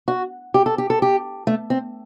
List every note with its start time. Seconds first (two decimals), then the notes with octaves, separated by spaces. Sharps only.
0.08 F#4
0.54 G4
0.66 A4
0.78 G4
0.90 A4
1.02 G4
1.47 A3
1.70 C4